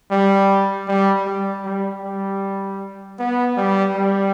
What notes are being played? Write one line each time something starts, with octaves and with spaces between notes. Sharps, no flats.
G3
G3
G3
G3
G3
B3
G3
G3